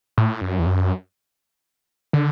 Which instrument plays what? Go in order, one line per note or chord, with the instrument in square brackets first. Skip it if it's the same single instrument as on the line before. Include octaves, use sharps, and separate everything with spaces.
[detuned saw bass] A2
F#2
E2
F#2
D3